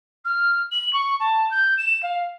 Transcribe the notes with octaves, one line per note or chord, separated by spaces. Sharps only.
F6
F#7
C#6
A5
G6
E7
F5